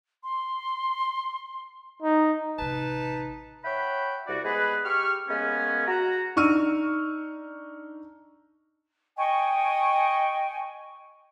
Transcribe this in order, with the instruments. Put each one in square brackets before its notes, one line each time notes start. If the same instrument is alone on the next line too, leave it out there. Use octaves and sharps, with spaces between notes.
[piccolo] C6
[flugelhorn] D#4
[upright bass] A1 C3 [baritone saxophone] D#4 [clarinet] B4 [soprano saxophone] A5
[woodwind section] C#5 E5 F#5 G5 B5
C2 F#4 D5
G#3 B3 G#4 B4
G4 C#6 F6
G#3 A#3 B3 C#4
F#4 A#5
[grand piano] D4 D#4 C#6 E6 F6 D#7
[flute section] D#5 G5 G#5 C#6